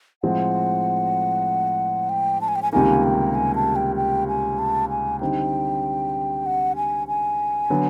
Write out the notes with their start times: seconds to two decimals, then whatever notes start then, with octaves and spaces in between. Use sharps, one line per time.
0.23 A2 F3 G#3 C4 F4 F#5
2.09 G5
2.41 A5
2.48 G#5
2.56 G5
2.62 G#5
2.73 C#2 C3 D#3 G3 A#3 G#5
3.04 G5
3.35 G#5
3.55 A5
3.76 G5
3.96 G5
4.28 G#5
4.59 A5
4.90 G#5
5.20 D3 G3 C4 D#4 G5
6.46 F#5
6.76 G#5
7.08 G#5
7.70 D3 F#3 B3